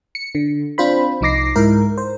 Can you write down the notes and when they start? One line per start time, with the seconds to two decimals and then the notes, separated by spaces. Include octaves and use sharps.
0.15 C#7
0.35 D3
0.78 C4 D4 F4 C5 B5
1.21 C2 F3 D#4 D6 A#6 C7
1.56 G#2 E4 A#4
1.98 C5